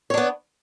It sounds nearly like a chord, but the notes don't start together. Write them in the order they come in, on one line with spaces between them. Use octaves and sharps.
C#5 D4 B3